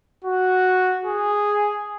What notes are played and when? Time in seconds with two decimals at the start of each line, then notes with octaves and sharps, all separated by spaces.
0.25 F#4
1.05 G#4